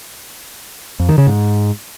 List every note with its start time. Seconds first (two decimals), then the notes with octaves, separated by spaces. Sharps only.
1.00 F2
1.09 D#3
1.18 C#3
1.27 G#2